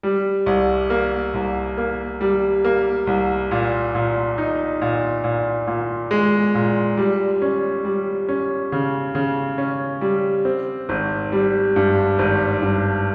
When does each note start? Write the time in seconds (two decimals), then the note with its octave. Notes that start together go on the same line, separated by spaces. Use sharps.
0.03 G3
0.46 C2
0.90 A#3
1.34 C2
1.78 A#3
2.21 G3
2.64 A#3
3.07 C2
3.51 A#2
3.95 A#2
4.38 D#4
4.82 A#2
5.24 A#2
5.67 A#2
6.11 G#3
6.55 A#2
6.97 G3
7.42 C#4
7.85 G3
8.29 C#4
8.72 C#3
9.15 C#3
9.58 C#4
10.01 G3
10.45 C4
10.89 G#1
11.32 G3
11.76 G2
12.19 G#1
12.62 G2